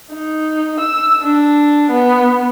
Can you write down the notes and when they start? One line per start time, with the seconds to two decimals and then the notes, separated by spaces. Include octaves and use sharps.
0.12 D#4
0.80 E6
1.22 D4
1.91 B3